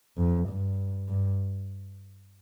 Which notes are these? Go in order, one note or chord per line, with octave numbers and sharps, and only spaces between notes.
F2
G2
G2